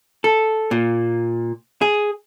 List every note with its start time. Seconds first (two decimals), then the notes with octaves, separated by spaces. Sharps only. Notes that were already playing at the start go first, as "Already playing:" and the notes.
0.24 A4
0.71 A#2
1.82 G#4